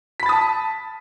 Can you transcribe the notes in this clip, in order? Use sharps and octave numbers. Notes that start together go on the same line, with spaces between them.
A5 B5 D#6 A6 B6